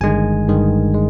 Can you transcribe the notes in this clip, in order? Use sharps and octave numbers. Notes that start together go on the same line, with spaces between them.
G1 G2 D#3 G#3 G#5
G1 G2 D#3 G#3
G#3